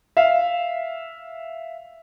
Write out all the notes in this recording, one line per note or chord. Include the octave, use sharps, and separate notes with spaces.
E5 F5